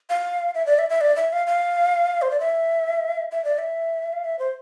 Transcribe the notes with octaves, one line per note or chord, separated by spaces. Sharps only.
F5
E5
D5
E5
E5
D5
E5
F5
F5
C5
D5
E5
E5
D5
E5
F5
E5
C5